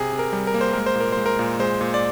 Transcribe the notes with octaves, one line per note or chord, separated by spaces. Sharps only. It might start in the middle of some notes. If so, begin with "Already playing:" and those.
Already playing: C3 G#4
C3
A#4
G3
A#4
A#3
C5
G#3 A#4
C5
A#2 A#4
G#3 C5
A#4
A#2
G#3 C5
A#2
D5